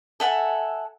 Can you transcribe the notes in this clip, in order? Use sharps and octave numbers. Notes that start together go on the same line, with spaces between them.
A4 E5 F#5 G#5